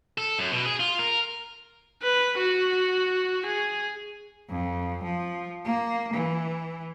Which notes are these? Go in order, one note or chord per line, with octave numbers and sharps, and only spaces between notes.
A4
F#2
B2
G#4
F4
A#4
B4
F#4
G#4
F2
F3
A#3
E3